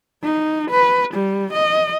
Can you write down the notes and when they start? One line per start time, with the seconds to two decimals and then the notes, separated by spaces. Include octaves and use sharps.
0.23 D#4
0.71 B4
1.14 G3
1.53 D#5